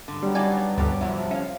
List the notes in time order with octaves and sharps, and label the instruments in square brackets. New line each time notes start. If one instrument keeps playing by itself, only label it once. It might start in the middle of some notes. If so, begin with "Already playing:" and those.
[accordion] G2 [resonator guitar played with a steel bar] D3
[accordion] F#3 B3 [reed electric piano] G3
[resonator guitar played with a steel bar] D4 D#4 F4 [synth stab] D5 G#5
[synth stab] D2 G2 [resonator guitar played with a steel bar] B2 G4
[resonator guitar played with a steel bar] E2 F#3 E4 [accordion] C3 F3
[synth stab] C#4 [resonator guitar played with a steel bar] E5 F5